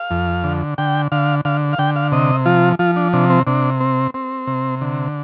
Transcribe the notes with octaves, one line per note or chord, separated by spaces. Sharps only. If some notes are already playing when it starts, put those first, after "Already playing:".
Already playing: F5
F2
D3
D3 G5
D3 F5
D3 F5
F5
D3 G5
F5
C3 D#5
F3 F4
F3 F4
D4
C3 D4
C4
C3 D4
C4
C4
C3
D3